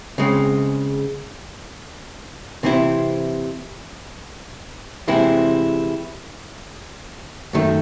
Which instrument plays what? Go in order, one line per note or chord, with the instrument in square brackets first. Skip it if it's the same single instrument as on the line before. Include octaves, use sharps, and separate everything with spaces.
[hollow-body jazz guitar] C#3 G#3 C4
C3 E3 C4 E4
C3 E3 G#3 C4 E4
F#2 D#3 A3